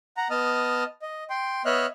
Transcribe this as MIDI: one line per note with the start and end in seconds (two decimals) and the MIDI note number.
0.17 0.28 78
0.17 0.28 82
0.30 0.84 59
0.30 0.84 75
0.30 0.84 81
0.30 0.84 87
0.30 0.84 89
1.02 1.24 75
1.30 1.62 79
1.30 1.62 84
1.65 1.86 59
1.65 1.86 73
1.65 1.86 75
1.65 1.86 76
1.65 1.86 89
1.65 1.86 90